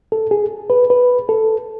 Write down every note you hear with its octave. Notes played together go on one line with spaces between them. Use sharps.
A4
G#4
B4
B4
A4